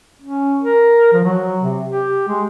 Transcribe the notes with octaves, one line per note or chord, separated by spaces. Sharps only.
C#4
A#4
F3
F#3
C3
G4
G#3